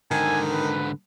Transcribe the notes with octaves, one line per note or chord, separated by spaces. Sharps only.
G#2 D3 D#3 G#5
B4